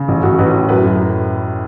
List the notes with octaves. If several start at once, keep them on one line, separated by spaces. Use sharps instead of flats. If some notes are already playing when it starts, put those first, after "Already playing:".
Already playing: C#3
A1
A1 F#4
A1 B4
A2
F#2 B4
F#2